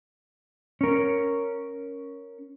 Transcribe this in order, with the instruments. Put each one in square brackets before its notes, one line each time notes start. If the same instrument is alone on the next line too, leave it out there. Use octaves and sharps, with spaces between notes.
[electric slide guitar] C#4 A#4